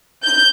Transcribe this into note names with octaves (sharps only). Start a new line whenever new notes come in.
G6